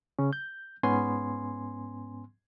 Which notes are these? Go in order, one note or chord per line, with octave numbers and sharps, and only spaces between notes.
C#3 C#4
G6
G#2 B3 C#4 G#5 C6